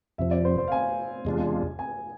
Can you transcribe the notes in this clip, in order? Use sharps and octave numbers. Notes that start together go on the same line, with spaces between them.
F2 C3 F3 E5
D5
C5
C5
F5
G#5
E2 C3 G#3 D4 F4
G#5